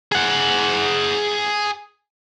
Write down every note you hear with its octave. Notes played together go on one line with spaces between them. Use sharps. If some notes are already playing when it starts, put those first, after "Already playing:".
G#4 F#5